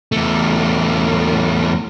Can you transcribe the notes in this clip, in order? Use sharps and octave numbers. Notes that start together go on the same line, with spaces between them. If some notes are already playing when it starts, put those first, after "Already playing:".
E2 A3